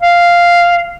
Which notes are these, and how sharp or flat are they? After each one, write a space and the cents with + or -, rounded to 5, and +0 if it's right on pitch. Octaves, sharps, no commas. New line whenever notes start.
F5 -5